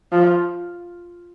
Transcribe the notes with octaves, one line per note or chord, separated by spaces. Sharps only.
F3